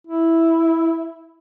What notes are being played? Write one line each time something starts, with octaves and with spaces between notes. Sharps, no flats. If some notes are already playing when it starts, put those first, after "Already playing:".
E4